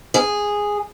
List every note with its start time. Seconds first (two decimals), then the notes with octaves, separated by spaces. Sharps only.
0.14 G#4